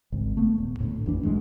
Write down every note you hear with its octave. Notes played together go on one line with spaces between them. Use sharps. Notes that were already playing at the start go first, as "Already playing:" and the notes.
G#1 C#2
A3 B3
D#1
D2 A2
A1 F2 E3 D4
B1 F#2 E3 G#3